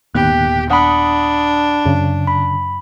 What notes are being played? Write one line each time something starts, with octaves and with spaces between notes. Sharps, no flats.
D#1 G#2 D#3 A#3 B3 G4 F#6
D4 F#5 B5 D#6
F#2 C#3
B5